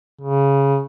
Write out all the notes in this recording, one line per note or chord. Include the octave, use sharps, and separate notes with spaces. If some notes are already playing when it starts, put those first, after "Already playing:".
C#3